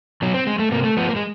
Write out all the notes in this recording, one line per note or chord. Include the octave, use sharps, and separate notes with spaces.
B2 F#3
C4
G#3
A3
C3 A#3
A3
F3 B3
A#3
G#3